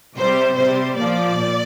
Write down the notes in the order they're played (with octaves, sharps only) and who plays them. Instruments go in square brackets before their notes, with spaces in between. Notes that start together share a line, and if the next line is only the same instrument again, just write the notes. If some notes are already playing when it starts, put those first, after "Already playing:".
[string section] C3 G3 C5
C3 G3 C5
A#2 F3 D5
A#2